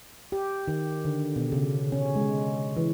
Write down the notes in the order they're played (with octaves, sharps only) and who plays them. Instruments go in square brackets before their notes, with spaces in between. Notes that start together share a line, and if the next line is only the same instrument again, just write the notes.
[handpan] G4
D#3
D3
B2
C#3
C#4
G#3
E3